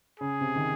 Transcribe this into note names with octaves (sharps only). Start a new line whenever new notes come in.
C#3 G#4
C3
D#3